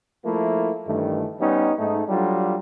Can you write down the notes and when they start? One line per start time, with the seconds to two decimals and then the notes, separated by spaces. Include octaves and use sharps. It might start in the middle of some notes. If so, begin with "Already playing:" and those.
0.25 F3 A3 A#3 E4 F4
0.87 G2 D#3 E3 A3
1.41 G3 B3 C#4 D#4
1.78 G#2 A3 D#4
2.09 F#3 G3 D4 F4 A4